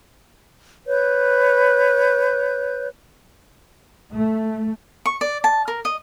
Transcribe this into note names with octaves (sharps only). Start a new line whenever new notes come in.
B4 C#5 G6
A3
C#6
D5
A5
A#4
D#5